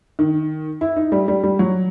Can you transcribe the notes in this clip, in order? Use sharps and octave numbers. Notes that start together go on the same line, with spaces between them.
D#3
E4
D#4
G3
G3
G3
F#3